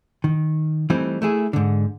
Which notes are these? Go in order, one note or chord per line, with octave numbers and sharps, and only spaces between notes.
D#3
E3 G3 A3 C4 D#4
A3 E4 G#4
G#2 D3